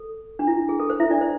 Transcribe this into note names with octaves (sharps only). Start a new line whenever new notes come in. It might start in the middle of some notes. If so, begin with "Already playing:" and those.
Already playing: A4
D4
E4
G#4
A4
C5
E4 E5
D4 D5
C5